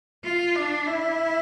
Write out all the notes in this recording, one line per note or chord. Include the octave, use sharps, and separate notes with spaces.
F4
D4
E4